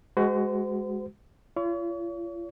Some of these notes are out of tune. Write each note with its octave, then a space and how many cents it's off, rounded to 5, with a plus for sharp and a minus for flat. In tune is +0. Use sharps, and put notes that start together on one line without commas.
G#3 +0 F#4 +15 C5 -40
F4 -40 C#5 +40